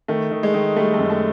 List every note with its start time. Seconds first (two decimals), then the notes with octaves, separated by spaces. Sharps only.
0.08 D#3 A3
0.31 D#3
0.43 G#3
0.54 D#3
0.76 G3 A3
0.94 A3
0.99 F#2
1.10 A3